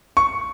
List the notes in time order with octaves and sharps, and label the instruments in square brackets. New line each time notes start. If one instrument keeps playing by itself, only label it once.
[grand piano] C#6